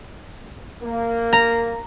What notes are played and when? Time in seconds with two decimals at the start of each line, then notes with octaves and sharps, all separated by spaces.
0.83 A#3
1.33 A#5